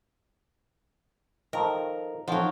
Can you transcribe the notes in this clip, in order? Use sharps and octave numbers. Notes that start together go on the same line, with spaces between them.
D#3 F3 A4 A#4
F2 F3 F#3 D#4 F#5